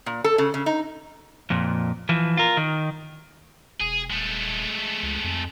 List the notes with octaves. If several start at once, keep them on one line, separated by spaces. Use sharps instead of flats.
A#2
A4
C#3
C#3
D#4
F2 A#2
E3 F3
F4 A#4
D#3
E1 G#4
D#1 G#3 A3
C#2
F2